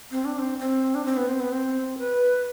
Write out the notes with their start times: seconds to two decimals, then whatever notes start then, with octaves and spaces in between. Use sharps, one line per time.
0.11 C4
0.25 D4
0.39 C4
0.59 C4
0.95 D4
1.05 C4
1.17 B3
1.29 C4
1.40 B3
1.52 C4
1.99 B4